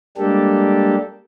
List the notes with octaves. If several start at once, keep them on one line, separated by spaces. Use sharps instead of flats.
G3 G#3 A#3 D4 G4 A4